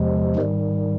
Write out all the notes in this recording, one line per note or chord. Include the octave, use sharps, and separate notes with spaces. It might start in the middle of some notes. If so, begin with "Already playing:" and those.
Already playing: E2 C3 F3 G#3
G#2 D#3 G3